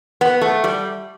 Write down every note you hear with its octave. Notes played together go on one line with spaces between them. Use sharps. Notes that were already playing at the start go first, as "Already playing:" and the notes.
B3
A3
G3